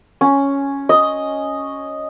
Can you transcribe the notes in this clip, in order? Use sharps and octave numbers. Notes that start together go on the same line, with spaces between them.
C#4
D#5